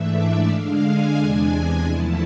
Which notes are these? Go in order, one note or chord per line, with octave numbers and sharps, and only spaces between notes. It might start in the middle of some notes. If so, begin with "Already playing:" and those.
Already playing: G#2 E3 A3 D4 E5
D5
D3 G#3 D4 F5
G#5
E2 C3 G#3 D4 G#5
E2 D3 F3 A3 E4 A5